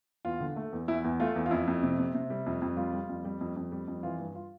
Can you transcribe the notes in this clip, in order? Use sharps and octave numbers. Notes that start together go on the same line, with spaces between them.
E2 F4
D3
A3
E2
E2 E4
E2
A3 F4
E2
F4
F2 E4
F2
C3
C3
C3
G3
F2
F2
G3 F4
G3
F2
G3
F2
F2
G3
F2
E3 F4
G2
F4